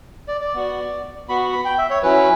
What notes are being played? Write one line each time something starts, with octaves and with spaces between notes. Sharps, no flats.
D5
D5
B3 F#4
B3 F#4 B5
B5
G5
E5
C#5
F#3 C#4 E4 B4